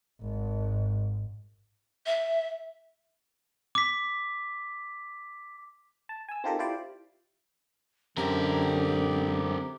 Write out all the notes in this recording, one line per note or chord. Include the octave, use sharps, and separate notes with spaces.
G#1 G#2
E5
D6 B6
A5
G#5 E6
C4 D#4 F4 G4 A4 A#4
E4 F4 G4 C5 D5
F#2 D3 C4 G4 A#4